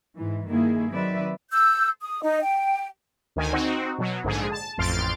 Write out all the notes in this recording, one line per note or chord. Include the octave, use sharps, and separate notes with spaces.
G#2 E3
G2 D#3 A#3 E4 G#4
D#3 F#3 C4 B4 D5 E5
E6 G6
D#6
D#4 D#5
G5
D2 D#3 G#5
C4 D#4 F#4
B2 F#3
A#1 G#2 D3 G#4
A5
A1 F2 C6 F6 A6 D7